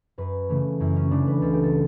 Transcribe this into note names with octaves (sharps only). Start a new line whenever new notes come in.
F#2 B4
C#3 E3 A3
F#2 E4
C#4
C#3 E3 A3 D4
B4
C#2 A4
G4
A4